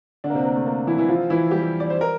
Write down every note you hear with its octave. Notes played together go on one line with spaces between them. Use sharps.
D3 D4
A#3
C3 C4
A#3
A3
A#3
E3 E4
E3 E4
F3 F4
E3 E4
G3 G4
D5
C5
A#4